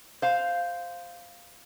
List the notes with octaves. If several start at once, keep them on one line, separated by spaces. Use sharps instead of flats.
C5 F5